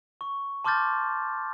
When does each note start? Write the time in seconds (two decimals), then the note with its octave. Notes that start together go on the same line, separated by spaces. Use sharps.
0.21 C#6
0.64 A5 C6 D6 F6 G6 A6